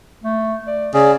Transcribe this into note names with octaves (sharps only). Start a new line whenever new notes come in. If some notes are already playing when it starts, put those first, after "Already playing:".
A3
D5
C#3 G#4 D5